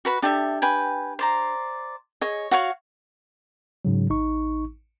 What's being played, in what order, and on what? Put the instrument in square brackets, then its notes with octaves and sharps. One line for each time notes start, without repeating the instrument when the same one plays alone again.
[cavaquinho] F#4 B4 B5
[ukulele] D4 G4 [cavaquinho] A4 E5
[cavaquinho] B4 G5 G#5
C5 D5 A#5
[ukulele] G#4 D#5 [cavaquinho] C#5
[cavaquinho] F#4 F5 C#6 [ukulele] C#5 F#5
[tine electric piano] G#2 C#3 F#3
A1 D#4 C#6